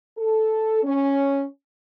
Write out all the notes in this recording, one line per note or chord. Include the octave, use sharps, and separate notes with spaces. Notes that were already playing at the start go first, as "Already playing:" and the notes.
A4
C#4